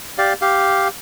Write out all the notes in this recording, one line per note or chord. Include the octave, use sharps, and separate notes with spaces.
G4 D5 F5
G4 F5